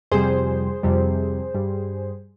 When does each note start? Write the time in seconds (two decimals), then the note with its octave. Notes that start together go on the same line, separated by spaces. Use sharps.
0.11 F2 C3 G3 G#4 C5
0.83 F2 C3 G3
1.55 G2 G3